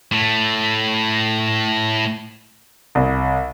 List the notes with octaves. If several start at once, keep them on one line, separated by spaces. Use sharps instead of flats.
A2 A3
C2